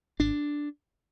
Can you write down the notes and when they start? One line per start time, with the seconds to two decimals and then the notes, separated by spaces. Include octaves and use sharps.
0.19 G#1 D4